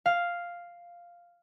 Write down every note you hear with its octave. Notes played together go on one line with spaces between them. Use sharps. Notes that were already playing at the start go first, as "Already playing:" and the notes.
F5